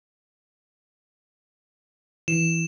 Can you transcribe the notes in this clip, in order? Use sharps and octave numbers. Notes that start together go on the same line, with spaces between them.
E3 E7